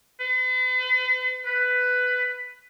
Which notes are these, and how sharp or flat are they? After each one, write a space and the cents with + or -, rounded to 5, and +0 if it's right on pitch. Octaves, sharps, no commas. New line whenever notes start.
B4 +45
B4 +10